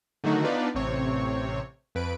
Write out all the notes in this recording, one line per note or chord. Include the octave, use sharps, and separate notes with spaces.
D3 D#3 F#3 A3 D#4 F#4
B3 D4 D#4 F4 B4 D5
A1 C3 C4 C#5
F2 B4 D7